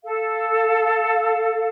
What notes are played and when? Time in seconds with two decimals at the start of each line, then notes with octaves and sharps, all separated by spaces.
0.04 A4 F5